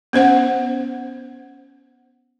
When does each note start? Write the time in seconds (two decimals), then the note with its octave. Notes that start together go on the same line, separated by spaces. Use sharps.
0.13 B3 C#4 C5 F#5